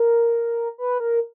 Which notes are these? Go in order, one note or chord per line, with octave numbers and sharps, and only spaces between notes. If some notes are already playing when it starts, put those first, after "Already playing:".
Already playing: A#4
B4
A#4